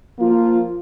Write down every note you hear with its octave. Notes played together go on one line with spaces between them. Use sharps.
F3 A#3 F4